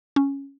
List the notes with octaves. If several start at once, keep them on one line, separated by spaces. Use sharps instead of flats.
C#4